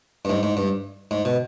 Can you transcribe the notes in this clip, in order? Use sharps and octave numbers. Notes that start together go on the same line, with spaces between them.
G2
G#2
G#2
G2
G#2
B2